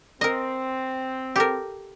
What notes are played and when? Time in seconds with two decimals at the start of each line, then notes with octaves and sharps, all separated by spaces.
0.21 C4 A#4 D#5
1.36 G4 A4 A#4